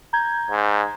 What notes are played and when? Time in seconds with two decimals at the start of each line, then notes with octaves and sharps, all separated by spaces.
0.13 A#5 G6 G#6
0.51 G#2